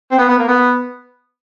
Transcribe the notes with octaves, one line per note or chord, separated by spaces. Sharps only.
C4
B3
B3
A#3
B3